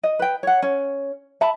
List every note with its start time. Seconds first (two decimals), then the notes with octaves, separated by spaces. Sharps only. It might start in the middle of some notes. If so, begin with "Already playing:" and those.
0.03 D#5
0.19 B4 G5
0.43 C#5 F#5
0.62 C#4
1.41 E5 A5 B5